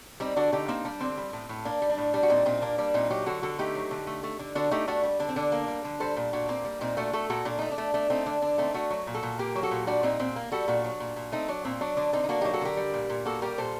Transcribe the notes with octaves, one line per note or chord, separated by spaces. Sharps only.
G3 C4 D#4
D3 D4 F#4
D3 D#4 G4
A#3 C4 D#4
G3 D4
D3 C4
G3
A2
A2
A#3 D4
G3
D4
A2
G3 D4
F#4
A#2 C4 D#4
A#2 C4 D#4
A#3 D4
G3 D4
A#2 C4 D#4
F#3 D#4 G4
D3 F#4 A4
D3 F#4 A4
A3 D#4 G4
F#3
D3
A3
A3
D3
D3 D4 F#4
A3 D#4 G4
A3 D4 F#4
G3
D3 D4
C4
D3 D4
A#3
G3
D3
G3 A4 C5
A#2
A#2 D4 F#4
A#3 C4
G3
A#2 C4 D#4
A3 D4 F#4
A3 F#4 A4
A#2 F#4 A4
A#2 D4
A3 D#4
D4
A3
A3 D4
A3 C4 D#4
D3 D4
D3 D4
A3 C4 D#4
A3 D4 F#4
F#3
A#2
F#4 A4
A#2
A#3 G4 A#4
F#3
F#4 A4
A#2
G3 D4 F#4
A#2 C4 D#4
A#2 C4
A#3
G3 F#4 A4
A#2 D4 F#4
F#3
A#2
A#2
A3 C4 D#4
F#3 D4
A#2 C4
F#3 D4
D3 D4
D3 C4 D#4
D#4
A#3 D4 F#4
F#3 D#4 G4
F#4 A4
D3 G4 A#4
G3
A#2
A#2
A#3 F#4 A4
G3 G4 A#4
A#2 A4 C5